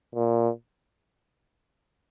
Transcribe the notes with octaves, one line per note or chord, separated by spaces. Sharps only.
A#2